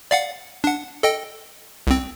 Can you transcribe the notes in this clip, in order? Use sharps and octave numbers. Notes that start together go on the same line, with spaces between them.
D5 F5 F#5
D4 F#5
A4 D#5 G5
C2 C4